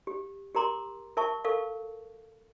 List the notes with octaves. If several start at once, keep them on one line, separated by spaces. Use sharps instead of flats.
G4
G4 A#4 A#5 C6 D6
A#4 E5 A5 C#6
A4 A#4 F5 C#6